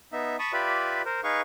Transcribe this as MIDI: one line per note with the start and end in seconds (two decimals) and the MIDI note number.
0.12 0.36 59
0.12 0.36 63
0.12 0.36 76
0.39 0.52 81
0.39 0.52 83
0.39 0.52 85
0.39 0.52 87
0.53 1.02 65
0.53 1.02 67
0.53 1.02 71
0.53 1.02 74
0.53 1.02 76
0.53 1.02 83
1.05 1.21 70
1.05 1.21 72
1.23 1.41 63
1.23 1.41 68
1.23 1.41 71
1.23 1.41 77
1.23 1.41 85